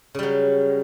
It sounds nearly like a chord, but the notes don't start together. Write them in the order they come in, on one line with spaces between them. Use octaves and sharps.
C#3 G3 F#3